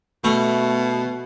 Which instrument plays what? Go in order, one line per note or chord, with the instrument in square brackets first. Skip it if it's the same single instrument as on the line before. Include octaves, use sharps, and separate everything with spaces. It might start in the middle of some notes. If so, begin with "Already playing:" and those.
[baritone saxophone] B2 [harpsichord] A3